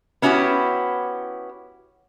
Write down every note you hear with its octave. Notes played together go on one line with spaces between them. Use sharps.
B3 C#4 E4 F#4 G4